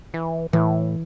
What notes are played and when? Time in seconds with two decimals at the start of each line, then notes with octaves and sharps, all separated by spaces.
0.14 E3
0.53 A2 E3